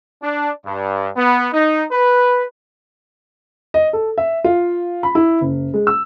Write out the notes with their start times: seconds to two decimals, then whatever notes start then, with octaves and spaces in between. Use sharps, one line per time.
0.22 D4
0.65 G2
1.16 B3
1.52 D#4
1.91 B4
3.74 D#5
3.93 A4
4.18 E5
4.44 F4
5.03 B5
5.15 E4
5.41 F#1
5.74 G#3
5.87 E6